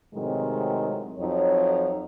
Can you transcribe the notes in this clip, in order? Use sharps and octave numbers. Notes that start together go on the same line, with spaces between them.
A2 C3 D#3 F#3 G#3
F2 F#3 D#4 C#5